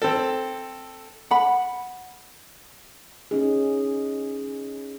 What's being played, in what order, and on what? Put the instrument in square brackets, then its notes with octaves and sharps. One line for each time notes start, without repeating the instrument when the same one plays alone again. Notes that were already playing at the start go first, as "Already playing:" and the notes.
[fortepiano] C4 A4
[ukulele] F#5 B5
[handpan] C#4 D#4 G#4